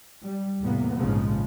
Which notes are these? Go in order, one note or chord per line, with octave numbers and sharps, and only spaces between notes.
G3
E2 A2 C3 A#3 B3
A#1 G#2 C#3 F3 G#3